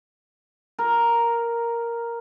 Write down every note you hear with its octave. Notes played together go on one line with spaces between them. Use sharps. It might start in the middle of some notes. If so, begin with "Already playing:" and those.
A#4